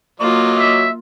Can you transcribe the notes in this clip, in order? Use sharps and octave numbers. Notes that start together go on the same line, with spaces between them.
F#3 A#3 F4 D#5 D6
E5